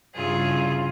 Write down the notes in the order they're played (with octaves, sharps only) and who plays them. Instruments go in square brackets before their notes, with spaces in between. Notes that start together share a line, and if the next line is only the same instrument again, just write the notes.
[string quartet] G2 C#3 E4 F4 G#4